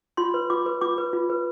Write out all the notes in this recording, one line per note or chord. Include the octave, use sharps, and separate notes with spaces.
F4 C6
B4
F4 D6
B4
F4 D6
B4
F4
B4